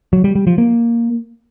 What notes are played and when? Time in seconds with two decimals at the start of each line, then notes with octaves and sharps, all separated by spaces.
0.13 F#3
0.24 G3
0.35 G3
0.47 F3
0.58 A#3